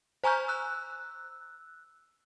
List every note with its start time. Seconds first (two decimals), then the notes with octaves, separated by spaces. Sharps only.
0.24 C5 G#5 A#5 C#6 F6 G6
0.48 E6 F#6